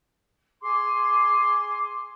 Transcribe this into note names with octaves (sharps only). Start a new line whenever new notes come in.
G#4 C6 D6